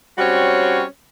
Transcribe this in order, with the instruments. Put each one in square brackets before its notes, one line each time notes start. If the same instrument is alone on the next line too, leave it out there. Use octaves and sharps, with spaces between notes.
[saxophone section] G3 C4 C#4 F#4 C#5